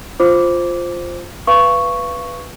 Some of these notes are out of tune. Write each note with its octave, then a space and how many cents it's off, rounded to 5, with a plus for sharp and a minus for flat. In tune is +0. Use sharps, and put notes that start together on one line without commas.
F4 +0 C5 +0 D6 -10
B4 +0 F5 -30 C#6 +0